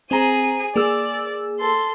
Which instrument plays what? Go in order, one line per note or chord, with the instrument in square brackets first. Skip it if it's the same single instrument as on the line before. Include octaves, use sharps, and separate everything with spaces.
[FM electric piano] C4 A#5 [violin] G#4 D#7
[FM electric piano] A#3 G#4 E6 [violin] D5
[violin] A4 C6